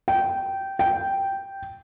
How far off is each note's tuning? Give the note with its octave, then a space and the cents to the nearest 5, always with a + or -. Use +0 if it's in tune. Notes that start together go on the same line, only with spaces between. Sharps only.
G5 -15
G5 -5